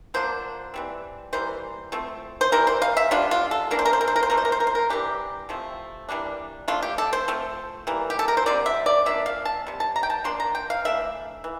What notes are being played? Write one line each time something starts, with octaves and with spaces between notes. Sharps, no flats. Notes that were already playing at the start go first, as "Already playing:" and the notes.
D3 F3 A#3 D4 C5
E3 G3 C4
E3 G3 A#3 C5
F3 A3 C4
C5
E3 G3 C4 A#4
C5
F5
E5
D3 G3 D4 F4
F4
A4
E3 A#3 D4 A#4
C5
A#4
C5
A#4
C5
A#4
C5
F3 A3 D4 A#4
C5
A#4
C5
A#4
C5
A#4
E3 G3 D4 G4
C3 F3 A3 C4
E3 G3 A#3 D4
F3 A3 D4 F4
G4
A4
C5
F3 A3 C4
E3 G3 A#3
G4
A4
A#4
C5
D3 G3 C4 D5
E5
D5
F3 A#3 D4 E5
F5
A5
C3 G3
A5
A#5
G5
A5
F3 A#3 D4 C6
A#5
G5
F5
E3 A3 D4 E5
E3